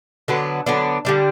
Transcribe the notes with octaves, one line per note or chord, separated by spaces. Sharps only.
D3 F#3 B3 D4
D3 F#3 B3 D4
D3 G3 D4